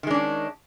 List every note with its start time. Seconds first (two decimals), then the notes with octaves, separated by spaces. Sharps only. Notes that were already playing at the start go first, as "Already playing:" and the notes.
0.03 D#3
0.07 G#3
0.11 D4
0.14 C#4